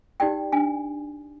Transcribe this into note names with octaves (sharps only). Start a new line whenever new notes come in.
D#4 G4 D5 G5
D4 G#5